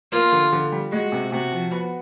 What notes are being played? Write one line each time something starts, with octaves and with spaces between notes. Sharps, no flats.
A#3 F4
D3
D3
G3
G#3 F#4
C3
C3 F#4
F3
B3